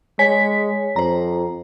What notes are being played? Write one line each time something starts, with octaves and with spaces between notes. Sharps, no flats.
G#3 C#5 G#5 B6
F2 C5 A#5